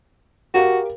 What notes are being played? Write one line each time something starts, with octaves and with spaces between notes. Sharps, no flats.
F#4 G4 A#4 F5